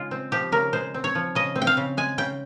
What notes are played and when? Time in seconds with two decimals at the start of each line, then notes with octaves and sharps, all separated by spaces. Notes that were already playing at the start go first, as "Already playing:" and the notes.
Already playing: C#3 G#3 F4
0.11 C4
0.32 F3 G4
0.52 C#3 A#4
0.73 G#3 C5
0.94 C4
1.04 C#5
1.15 F3
1.35 C#3 D#5
1.56 C4
1.62 G5
1.67 F5
1.77 C#3
1.97 G#3 G#5
2.18 C#3 G5